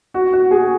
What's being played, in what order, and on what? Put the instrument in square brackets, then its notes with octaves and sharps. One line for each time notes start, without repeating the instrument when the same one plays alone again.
[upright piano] F#4
F#4
G#4